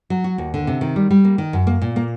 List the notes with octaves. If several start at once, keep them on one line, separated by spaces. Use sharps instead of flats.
F#3
F#4
D#2
D3
C3
D#3
G3
G3
A#3
D#3
F#2
A#3
A#2
A#3